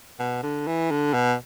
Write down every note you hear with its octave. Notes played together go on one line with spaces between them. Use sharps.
B2
D3
E3
D3
B2